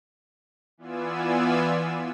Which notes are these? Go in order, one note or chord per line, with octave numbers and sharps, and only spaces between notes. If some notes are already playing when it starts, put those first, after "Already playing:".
E3 B3 F4 D5 G#5 E6